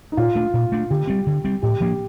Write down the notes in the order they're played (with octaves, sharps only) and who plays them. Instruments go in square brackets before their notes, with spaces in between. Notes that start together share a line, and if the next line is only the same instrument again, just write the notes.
[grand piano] D#4
[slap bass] A#2 [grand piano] F4
[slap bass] A3 D4
A#2
A3 D4
[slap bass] D3 [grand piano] G4
[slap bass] G3 C4
D3
G3 C4
[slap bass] A2 [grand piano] G4
[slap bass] F3 A#3 D4